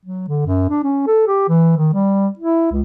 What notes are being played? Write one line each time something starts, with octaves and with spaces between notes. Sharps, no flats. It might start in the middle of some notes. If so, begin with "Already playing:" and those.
F#3
D3
F#2
D4
C#4
A4
G4
E3
D#3
G3
E4
C#2